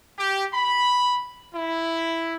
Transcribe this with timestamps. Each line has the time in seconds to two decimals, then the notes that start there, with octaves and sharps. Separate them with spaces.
0.18 G4
0.54 B5
1.55 E4